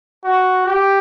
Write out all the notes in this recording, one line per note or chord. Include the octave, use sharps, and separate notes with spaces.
F#4
G4